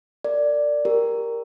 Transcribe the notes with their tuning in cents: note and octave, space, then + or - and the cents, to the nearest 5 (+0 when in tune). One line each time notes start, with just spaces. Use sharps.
A#4 -20 D5 +0
G4 +15 A#4 +0